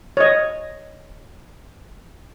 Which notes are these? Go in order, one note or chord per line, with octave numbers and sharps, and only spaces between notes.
C#5 D#5